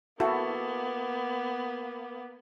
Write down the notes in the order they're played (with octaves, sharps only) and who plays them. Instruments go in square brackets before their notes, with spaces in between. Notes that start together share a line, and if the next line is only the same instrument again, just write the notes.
[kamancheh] A#3 B3 [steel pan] E4 F#4 A4